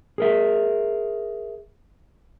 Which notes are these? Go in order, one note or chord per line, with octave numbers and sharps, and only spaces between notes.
G#4 A#4 E5